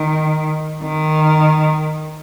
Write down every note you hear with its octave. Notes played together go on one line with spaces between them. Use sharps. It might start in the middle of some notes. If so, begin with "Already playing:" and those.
Already playing: D#3
D#3